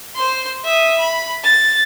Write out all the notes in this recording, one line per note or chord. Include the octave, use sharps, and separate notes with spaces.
C5 C6
E5 D#6
B5
A6